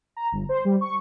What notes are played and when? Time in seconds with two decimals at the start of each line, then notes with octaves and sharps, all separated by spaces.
0.17 A#5
0.32 G1
0.49 C5
0.65 G3
0.81 C#6